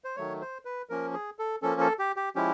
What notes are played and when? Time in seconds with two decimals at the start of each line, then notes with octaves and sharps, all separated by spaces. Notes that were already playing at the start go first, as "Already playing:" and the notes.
0.04 C5
0.16 D#3 F#3 A3 C#5
0.41 C5
0.65 B4
0.89 F3 A#3 C#4 A#4
1.13 G#4
1.39 A4
1.62 F3 A#3 C#4 A4
1.81 A4
1.99 G4
2.16 G4
2.35 F3 G#3 C#4 E4 G4